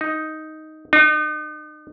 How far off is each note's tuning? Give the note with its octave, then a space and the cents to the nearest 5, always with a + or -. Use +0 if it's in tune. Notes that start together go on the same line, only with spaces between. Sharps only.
D#4 +5
D#4 -40